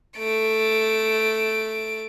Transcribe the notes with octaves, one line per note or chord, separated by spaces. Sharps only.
A3 D7